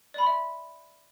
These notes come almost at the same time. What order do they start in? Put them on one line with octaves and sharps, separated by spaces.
D5 B5 C6 E5